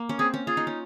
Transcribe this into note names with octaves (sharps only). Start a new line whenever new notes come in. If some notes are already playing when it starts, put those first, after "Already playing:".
Already playing: A#3
C#4
C4 G#4
C#4
F4 G#4
D#4
C#4